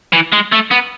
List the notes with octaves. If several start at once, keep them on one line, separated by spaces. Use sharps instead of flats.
E3
G#3
A3
B3